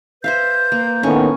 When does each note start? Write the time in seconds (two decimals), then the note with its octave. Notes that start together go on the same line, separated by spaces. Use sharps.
0.24 B4 C5 E5 F5 G6
0.72 A#3
1.03 A2 D#3 B3 C#4